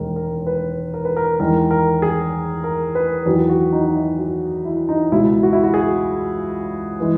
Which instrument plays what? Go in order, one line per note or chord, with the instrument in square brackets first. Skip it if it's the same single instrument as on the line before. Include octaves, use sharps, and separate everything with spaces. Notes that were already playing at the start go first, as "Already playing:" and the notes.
Already playing: [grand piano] E1 D#2 D#3 G#3 A#4
A#4
B4
A#4
B4
A#4
E2 D#3 G#3 A#4
A#4
G#4
A#4
B4
E2 D#3 F#3 B4
F#4
D#4
D#4
E4
F#4
E4
D#4
C#2 B2 G#3 E4
F#4
E4
F#4
G#4
E3 G#3